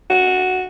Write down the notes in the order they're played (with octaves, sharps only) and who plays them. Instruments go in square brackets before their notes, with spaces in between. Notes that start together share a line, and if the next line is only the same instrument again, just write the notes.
[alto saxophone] F#4